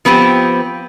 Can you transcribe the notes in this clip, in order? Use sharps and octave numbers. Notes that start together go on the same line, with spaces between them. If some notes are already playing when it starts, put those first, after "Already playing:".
F3 B3 C4 G4